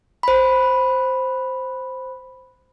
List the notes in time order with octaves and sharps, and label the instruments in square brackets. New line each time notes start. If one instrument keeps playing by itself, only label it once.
[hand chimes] C5 B5